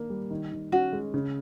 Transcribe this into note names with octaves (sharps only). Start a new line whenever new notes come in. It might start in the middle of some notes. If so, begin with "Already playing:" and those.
Already playing: D#3 A#3 D4
G3
D#3
D#3
C#4 F#4
G#3
C#3